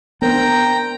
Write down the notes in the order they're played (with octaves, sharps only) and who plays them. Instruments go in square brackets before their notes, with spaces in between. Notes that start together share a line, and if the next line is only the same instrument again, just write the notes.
[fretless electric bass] B3 [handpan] D4 A#4 C5 [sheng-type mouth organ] G5 A#5